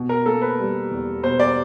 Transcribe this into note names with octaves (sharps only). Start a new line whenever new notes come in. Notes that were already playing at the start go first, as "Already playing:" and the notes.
Already playing: B2
A#4
A#3 A4
B4
G3
E2
B2 C5
D5